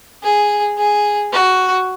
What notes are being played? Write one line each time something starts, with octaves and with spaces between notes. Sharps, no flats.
G#4
G#4
F#4